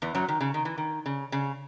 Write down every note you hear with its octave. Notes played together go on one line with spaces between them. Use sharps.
E2 E3
F#2 F#3
D#3
C#3
D#3
E3
D#3
C#3
C#3